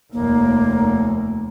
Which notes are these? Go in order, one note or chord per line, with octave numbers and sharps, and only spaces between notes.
F1 D#2 A#3